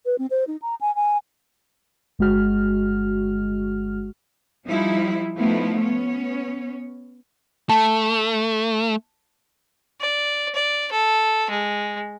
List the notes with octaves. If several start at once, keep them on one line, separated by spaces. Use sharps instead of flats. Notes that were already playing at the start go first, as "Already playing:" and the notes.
B4
C4
C5
D#4
A#5
G#5
G#5
G1 G#3 F#4 F6
F3 G3 D#4 E4
F3 A3 B3 D#4 E4
B3 C#4 C#5
A3 A5
D5
D5
A4
G#3